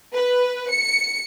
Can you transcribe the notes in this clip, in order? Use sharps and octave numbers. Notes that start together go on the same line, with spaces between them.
B4
C#7